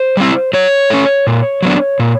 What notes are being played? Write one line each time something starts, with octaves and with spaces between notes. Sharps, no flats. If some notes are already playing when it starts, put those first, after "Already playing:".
Already playing: C5
G3 C4 E4
F#3 C#5
A3 C#4
A#2
F#3 B3 D4
A#2